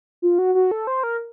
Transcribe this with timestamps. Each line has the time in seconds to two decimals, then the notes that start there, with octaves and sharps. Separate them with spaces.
0.22 F4
0.39 F#4
0.55 F#4
0.71 A4
0.87 C5
1.03 A#4